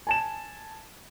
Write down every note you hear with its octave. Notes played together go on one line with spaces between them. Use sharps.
G#5 A5 E7